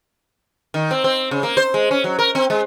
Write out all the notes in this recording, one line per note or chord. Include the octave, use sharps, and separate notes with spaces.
D#3
C4
C4
C#3
A#3
C5
G#3
C#4
F#3
A#4
C4
G#3